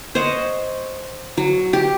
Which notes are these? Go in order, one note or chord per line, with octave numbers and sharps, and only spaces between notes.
C5 C#5 D#5 F#5
F#3
G4